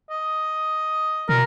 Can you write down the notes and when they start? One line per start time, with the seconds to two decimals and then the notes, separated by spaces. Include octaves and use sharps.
0.10 D#5
1.29 B2 A#4